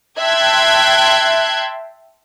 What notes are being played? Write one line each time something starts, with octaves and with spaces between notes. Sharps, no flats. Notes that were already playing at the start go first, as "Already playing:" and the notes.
E5 G5 A5 C6 F#6 G#6